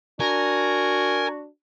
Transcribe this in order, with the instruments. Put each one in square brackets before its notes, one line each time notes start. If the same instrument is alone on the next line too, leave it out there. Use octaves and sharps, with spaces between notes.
[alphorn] D4 [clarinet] F#4 [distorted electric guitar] A#4 [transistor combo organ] G#5